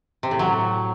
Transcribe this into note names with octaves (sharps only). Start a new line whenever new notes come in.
C3
A2
F#3